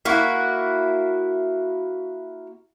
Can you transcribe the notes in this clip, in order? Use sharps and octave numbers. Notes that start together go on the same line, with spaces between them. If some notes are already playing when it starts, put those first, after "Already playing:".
A#3 E4 F#4